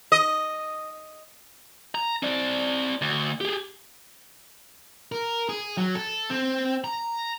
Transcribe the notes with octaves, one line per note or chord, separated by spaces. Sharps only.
D#5
A#5
C4 D5
D2
G4 G#4
A#4
G#4
F#3
A4
C4
A#5